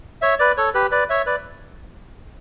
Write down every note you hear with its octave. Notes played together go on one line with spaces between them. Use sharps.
C#5 E5
B4 D5
A4 C#5
G4 B4
B4 D5
C#5 E5
B4 D5